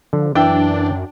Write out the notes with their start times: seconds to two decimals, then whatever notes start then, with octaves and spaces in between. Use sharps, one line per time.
0.13 D3 F3
0.35 F#2 E3 D4 E5 G5